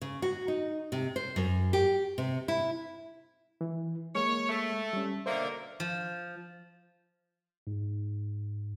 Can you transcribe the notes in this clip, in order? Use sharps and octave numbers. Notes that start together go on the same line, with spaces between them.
C#3
F#4
D#4
C3
C5
F#2
G4
C3
E4
E3
G#3 A#3 C#5
A3
G3 C#4
B2 D3 A#3 C5 E5
F3
G#2